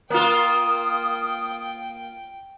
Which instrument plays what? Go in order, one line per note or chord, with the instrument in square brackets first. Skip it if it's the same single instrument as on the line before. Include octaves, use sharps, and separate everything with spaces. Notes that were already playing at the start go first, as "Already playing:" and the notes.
[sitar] A#3 F4 [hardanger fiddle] G5 [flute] D#6